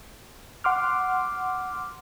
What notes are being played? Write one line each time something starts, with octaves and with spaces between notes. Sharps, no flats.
F#5 C6 D6 F6